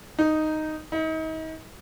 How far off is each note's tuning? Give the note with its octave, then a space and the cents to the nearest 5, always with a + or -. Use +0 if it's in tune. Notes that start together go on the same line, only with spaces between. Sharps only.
D#4 -5
D#4 +35